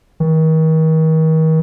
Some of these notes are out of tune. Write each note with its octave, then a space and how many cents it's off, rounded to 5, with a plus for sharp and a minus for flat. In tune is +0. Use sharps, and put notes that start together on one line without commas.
D#3 +40